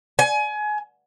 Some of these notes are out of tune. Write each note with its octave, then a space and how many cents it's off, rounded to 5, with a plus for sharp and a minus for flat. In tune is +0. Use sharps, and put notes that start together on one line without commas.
G#5 +25